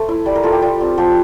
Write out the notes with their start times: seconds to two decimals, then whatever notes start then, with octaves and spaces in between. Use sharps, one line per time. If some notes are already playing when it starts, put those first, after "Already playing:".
Already playing: A3 C5
0.09 E4
0.26 G3 D5
0.35 A#4
0.43 F4 A4
0.52 G4
0.62 G3 F4
0.80 C4
0.98 F3 G4